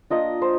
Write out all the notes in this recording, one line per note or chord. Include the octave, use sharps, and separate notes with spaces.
A#3 D4 F4 D#5
C5